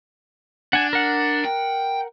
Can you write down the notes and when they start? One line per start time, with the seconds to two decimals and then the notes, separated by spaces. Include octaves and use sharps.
0.73 D4 F#5 G#5
0.93 A#4 F#5
1.45 G5